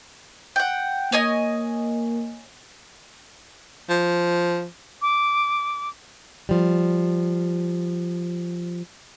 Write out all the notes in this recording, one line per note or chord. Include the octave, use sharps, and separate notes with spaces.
F#5 G5
A#3 C#5 D#5 G#5
F3
D6
F3 G3